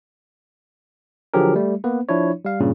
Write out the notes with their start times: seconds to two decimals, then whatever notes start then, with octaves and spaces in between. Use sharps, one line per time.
1.34 D3 F3 F#3 G4 G#4 A#4
1.56 G3 A3
1.84 A#3 B3 B4
2.09 F3 D4 E4 C#5
2.45 G3 F5
2.60 G2 A#2 C#3